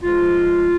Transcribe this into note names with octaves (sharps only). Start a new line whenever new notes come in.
G#2 F3 G#3 F4